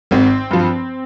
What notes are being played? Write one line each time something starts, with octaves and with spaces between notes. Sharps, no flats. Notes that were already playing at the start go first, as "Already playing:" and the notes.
G#1 C4
G2 F3